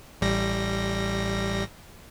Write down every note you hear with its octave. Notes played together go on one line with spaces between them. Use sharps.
A1 G3 A#6